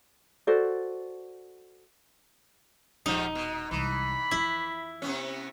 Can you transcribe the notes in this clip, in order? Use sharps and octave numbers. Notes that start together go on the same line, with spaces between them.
F#4 A4 C5 D5
D#1 G#2 F3 G3 D#4
B2
C2 E3 G#3 B5
F2 F3 E4
C3 B3 C#4